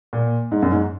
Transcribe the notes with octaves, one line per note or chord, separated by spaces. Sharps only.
A#2
G#2
F#2
G#2